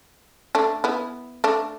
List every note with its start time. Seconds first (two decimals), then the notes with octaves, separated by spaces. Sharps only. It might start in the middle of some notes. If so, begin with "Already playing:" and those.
0.55 A3 D4
0.84 B3 E4
1.44 A3 D4